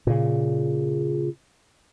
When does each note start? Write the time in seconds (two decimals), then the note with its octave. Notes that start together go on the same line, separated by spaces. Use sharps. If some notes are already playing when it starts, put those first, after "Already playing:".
0.07 A#2 C#3